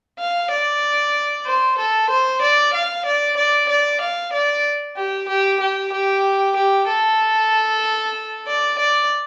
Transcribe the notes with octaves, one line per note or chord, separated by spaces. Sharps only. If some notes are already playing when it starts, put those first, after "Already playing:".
F5
D5
C5
A4
C5
D5
F5
D5
D5
D5
F5
D5
G4
G4
G4
G4
G4
A4
D5
D5